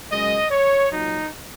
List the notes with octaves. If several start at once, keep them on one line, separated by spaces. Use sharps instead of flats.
F#2 C#3 G#3 D#5
C#5
A#2 F#3 D#4